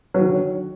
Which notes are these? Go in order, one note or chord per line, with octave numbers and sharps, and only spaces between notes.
D3 D#3 F#3